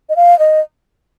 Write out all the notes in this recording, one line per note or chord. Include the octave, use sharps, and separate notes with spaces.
D#5
F5
D#5